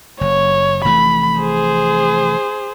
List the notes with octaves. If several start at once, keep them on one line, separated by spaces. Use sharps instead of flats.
F#1 C#5
F1 E3 A3 B5
G#4 C5